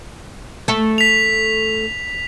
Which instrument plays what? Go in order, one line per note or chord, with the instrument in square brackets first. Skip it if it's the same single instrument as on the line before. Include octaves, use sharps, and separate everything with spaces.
[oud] A3 A4
[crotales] B6 F7